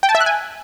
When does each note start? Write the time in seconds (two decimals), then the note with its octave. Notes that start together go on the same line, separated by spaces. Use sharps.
0.03 G5
0.09 A5
0.15 E5
0.20 F#6
0.26 G#5